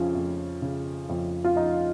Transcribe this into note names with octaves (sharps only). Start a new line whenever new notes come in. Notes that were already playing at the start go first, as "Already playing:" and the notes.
Already playing: F2 C#3 F3 C#4
F2
C#3
F2
F4
F3 D#4